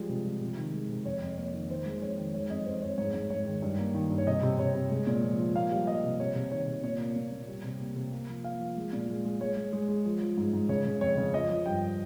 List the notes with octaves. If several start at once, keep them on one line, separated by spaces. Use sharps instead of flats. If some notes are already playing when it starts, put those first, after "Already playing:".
Already playing: F3 G3 G#3
C3
F3
C3
D#3
G#3
C3
F2 C#5
F2
A#3 C#5
D#3
D#3 C5
G#3
F2 C#5
D#3
G#3 C#5
F2 D#5
F2 C5
F2 C#5
G#2 C#5
G#2
G#2 C#5
D#3
G2
A#3
D#3
G2
C#5
C3 D#5
C3
C3 C#5
C3
G#3
A#2
F3
F3
A#3 F5
G3
G3 D#5
C3
C3 C#5
C3
D#3 C#5
C3
A#2 C#5
A#3
A#2
A#2
G3
C3
A#3
C3
A#3
F3
A#3 F5
F3
G#3
A#2
G#3
G#3
G#3 C#5
G#3
G#3
G#3
F3
F3
G#2
G#2
C#3 C#5
C#3
F2 C#5
C#3
F3 D#5
F3
G2 G5